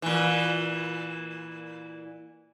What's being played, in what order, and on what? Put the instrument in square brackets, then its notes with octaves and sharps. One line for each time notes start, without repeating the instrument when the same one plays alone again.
[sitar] A#2 E3